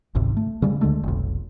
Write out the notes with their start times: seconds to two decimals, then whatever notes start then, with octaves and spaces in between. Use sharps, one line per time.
0.15 G#1 C#2 G#2 C3
0.37 A3
0.62 C#3 G3 G#3
0.81 D2 D3 G#3 A3
1.03 F1 B1